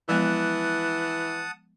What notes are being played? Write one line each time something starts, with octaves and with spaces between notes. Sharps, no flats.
E3 F3 G#3 B3 F#5 A5 D#6